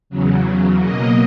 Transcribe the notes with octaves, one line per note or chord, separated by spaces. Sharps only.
E2 C#3 F#3
B2 F#3 A#3 D#5